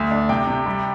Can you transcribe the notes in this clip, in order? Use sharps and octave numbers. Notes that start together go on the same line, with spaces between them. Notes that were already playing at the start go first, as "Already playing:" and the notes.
Already playing: D2
D4
C3 G5
C3
G3